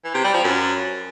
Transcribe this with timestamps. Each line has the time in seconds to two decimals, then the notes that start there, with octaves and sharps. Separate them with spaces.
0.05 E3
0.14 C3
0.24 G3
0.34 F3
0.44 F#2